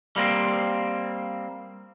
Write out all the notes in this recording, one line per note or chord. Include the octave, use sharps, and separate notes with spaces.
G3 A#3 C4